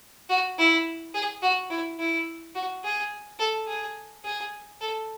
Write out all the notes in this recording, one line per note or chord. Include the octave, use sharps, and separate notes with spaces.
F#4
E4
G#4
F#4
E4
E4
F#4
G#4
A4
G#4
G#4
A4